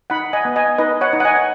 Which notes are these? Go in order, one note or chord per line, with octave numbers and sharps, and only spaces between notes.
D#4 F#5 B5
D#5 G#5
B3
D#5 G#5
D#4 B4 D#5
C#5 F#5
D#4
F#5
D#5 G#5